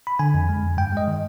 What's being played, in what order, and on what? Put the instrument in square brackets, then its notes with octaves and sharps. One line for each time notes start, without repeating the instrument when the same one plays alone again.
[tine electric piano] B5
D3 G#5
F2
G#3
F2
G2 G5
G#3 D#5
D#3